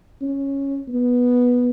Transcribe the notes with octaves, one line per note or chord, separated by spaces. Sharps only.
C#4
B3